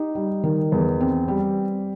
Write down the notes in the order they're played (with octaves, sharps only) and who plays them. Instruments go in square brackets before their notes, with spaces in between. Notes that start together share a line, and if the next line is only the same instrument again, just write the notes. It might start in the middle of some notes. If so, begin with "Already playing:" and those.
Already playing: [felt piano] D#4 G4
G3
D#3
E2
C4
G3